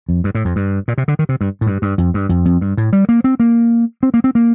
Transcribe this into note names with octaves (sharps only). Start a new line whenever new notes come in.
F2
G2
A2
F2
G2
A#2
C3
D3
D#3
C3
G2
A2
G2
G2
F2
G2
F2
F2
G2
A2
G3
A#3
C4
A#3
C4
A#3
C4
A#3